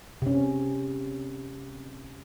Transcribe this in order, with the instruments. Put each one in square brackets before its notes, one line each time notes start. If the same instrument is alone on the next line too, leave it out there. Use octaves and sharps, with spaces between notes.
[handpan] C3 C#4